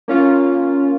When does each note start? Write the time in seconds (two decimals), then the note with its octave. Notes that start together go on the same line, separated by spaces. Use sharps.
0.08 A#3 C#4 F4